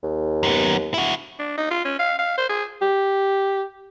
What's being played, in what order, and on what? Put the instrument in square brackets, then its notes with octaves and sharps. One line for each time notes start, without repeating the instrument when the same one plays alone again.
[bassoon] D#2
[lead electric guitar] F#2 B3
E4 F#4
[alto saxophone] D4
D#4
F4
C#4
F5
F5
C5
G#4
G4